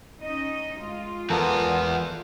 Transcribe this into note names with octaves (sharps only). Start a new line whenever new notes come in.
C#4 D#4 D#5
G#3 F4
E2 B3 A4 A#4